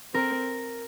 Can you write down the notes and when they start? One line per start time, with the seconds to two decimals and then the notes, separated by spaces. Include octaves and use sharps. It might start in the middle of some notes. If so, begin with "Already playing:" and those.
0.14 C4 A#4